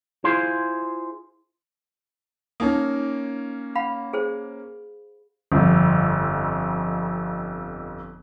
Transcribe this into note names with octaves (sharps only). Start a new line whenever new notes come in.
E4 F4 G#4 C5 F5 C6
A#3 C#4 D#4 D#6
F5 F#5 B5
G#4 C5
G1 F2